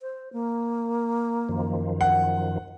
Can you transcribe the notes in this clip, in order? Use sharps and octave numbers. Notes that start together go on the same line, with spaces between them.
C5
A#3
F#2 D#3 F3
F#5